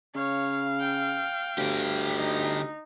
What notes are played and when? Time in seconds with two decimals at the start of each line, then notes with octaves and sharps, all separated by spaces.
0.15 C#3 C#5 F5
0.80 G5
1.58 D2 D3 G4
2.18 D#4